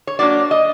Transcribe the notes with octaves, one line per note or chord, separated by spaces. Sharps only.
C#5
F#3 A#3 D4 D5
D#5